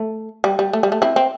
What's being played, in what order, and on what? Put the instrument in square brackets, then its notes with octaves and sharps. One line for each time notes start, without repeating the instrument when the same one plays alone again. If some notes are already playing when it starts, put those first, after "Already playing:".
Already playing: [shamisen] A3
G3
G3
A3
G3
A3
C4 E4
C4